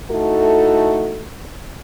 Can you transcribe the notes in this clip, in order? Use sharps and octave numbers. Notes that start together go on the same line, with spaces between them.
A3 D#4 E4 F#4 A4